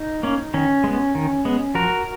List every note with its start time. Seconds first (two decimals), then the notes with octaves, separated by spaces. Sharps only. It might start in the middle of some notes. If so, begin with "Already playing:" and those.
Already playing: D#4
0.23 A#3 C#4
0.54 D#3 C#4
0.84 G#3 B3
1.15 D#3
1.45 G#3 B3
1.75 F3 F#4 A#4